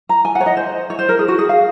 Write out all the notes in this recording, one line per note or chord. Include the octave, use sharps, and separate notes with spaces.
A#5
G#5
F#5
C#5
D#5
C5
C#5
C5
A#4
G#4
F#4
G#4
F5